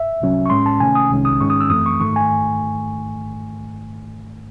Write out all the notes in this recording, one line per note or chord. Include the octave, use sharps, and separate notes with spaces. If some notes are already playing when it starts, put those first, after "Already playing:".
Already playing: E5
C2 C3 F#3 C#4
C#6
A2 G#3 C#4 C6
A5
C3 D#3 A3 C#4 G#5
D#6
C2 C3 D#3 G#3 C#4
D#6
G#2 D#3 G#3 C#4 C#6
D#6
E6
F#2 E3 A3 C4 D#6
C#6
G#2 D#3 A3 C#6
G#5